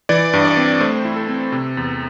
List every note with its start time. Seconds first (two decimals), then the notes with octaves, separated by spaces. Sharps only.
0.09 E3 D5
0.34 G2
0.45 D5
0.57 C4
0.81 A3 C5
1.05 E4
1.16 A4
1.28 C4
1.52 C3
1.77 E2